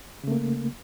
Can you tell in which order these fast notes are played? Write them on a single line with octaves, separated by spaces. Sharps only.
C#3 A3 A#3